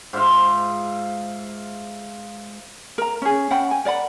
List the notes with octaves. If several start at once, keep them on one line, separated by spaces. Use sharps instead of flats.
G#2 F4 E5 F5
A#4 A#5
C#4 G#4
C#4 F#5 G5 B5
G#5
A#4 D5 F#5 B5